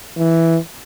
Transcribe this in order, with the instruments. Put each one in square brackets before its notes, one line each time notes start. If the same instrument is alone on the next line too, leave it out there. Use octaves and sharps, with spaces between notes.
[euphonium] E3